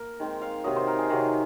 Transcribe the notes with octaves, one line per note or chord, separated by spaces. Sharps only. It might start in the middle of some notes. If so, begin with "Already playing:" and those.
Already playing: A#3 A#4
D#3 G#3 C4
F5
C3 D#3 F#3 D#5
C5
A#4
G#4
C3 D#3 F#3 D#5